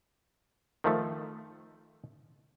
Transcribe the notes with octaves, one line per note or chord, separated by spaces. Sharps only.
D#3 F3 A3